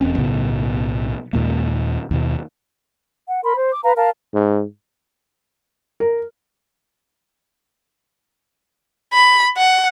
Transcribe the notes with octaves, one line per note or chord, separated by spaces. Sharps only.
E1 E2 C4 C#4
B1 A2 C#3 B3
D#2 A#2 G#3 A#3
D#2 B2
F#5
A#4 B5 C6
C5
D6
B4 F5 A#5
A#4 F5 A5
G#2
A#4
B5
F#5